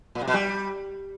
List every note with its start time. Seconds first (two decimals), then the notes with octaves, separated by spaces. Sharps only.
0.15 A#2
0.21 C3
0.28 B2
0.34 G3